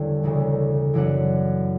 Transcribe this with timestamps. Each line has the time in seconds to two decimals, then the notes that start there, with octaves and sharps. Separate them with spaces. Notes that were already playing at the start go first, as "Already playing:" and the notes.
Already playing: E2 D3 G3 A#3 C#4
0.23 E1 D2 C#3 E3
0.93 F#2 E3 B3 D4 F#5